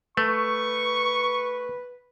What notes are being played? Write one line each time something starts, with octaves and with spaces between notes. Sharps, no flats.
A3 B4 C#6